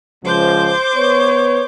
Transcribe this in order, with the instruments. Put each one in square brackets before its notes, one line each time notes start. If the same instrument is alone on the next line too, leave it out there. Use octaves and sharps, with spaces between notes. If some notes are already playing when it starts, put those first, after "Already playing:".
[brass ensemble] C#2 F3 [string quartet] C5 D6 G6
[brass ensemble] B3 B4 C#5